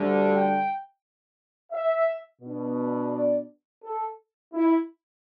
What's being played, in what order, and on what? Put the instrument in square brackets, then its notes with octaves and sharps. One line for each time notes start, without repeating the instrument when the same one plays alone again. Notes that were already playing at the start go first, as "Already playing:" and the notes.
Already playing: [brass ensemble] D2 D3 G3
G5
E5
B2 B3 D4
D5
A4
E4